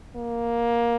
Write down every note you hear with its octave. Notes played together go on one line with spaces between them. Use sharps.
A#3